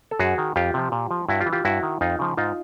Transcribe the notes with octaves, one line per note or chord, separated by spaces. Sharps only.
A4
F#2 F#4 G#4
D#3
F2 F4 G4
C3 F3
A#2
F3
G2 E4 F#4
F4 G4
E3
F4 G4
G2 E4 F#4
D#3
F2 D#4 F4
C#3 F3
G#2 D#4 F4